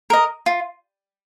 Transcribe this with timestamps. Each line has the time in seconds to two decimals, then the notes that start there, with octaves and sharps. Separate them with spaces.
0.10 A#4 D#5
0.46 F4